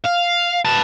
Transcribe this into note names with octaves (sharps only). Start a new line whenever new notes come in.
F5
B3 A5